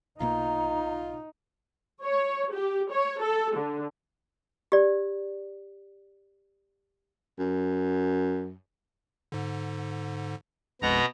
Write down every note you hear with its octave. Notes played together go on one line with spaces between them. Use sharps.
B1 B2 A#3 D#4 F4 A#5
C#5
G4
C#5
A4
D3
G4 D5
F#2
G#2 D3
A#1 F2 B2 G#3 B3 A#5